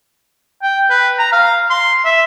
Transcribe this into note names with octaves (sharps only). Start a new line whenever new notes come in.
G5
B4
A#5
F5
C6
E5